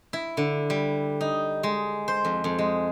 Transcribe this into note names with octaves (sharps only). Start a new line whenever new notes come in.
E4
D3
G3
D#4
G#3
C5
F2
F2
G#3